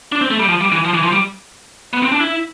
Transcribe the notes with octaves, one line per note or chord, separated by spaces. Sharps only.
D4
C4
A3
G3
F3
G3
E3
F3
E3
F3
G3
B3
C4
D4
E4